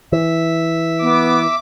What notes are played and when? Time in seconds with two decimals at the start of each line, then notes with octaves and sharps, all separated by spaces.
0.12 E3 E5
1.02 B3 D6